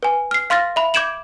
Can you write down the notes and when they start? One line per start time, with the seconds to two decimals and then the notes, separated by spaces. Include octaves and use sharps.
0.03 B4 G#5
0.31 F6 C7
0.50 F5 C6 F6 A6 A#6
0.76 E5 B5
0.94 D6 G6 G#6 D7 E7 F#7